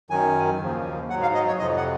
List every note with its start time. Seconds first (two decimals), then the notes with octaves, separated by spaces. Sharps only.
0.10 F#2 D#3 F#3 G#5
0.60 D#2 C#3 F3
1.10 F#3 F#5
1.13 G#2
1.22 F5
1.34 D#5
1.47 C#5
1.59 F2 C3 F3 D#5
1.77 F#5